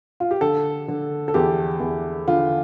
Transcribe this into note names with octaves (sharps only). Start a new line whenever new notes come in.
F4
G4
D3 A4
D3
A4
E2 G4
E2
D3 F4